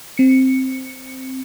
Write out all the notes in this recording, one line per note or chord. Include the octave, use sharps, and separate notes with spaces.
C4 C#7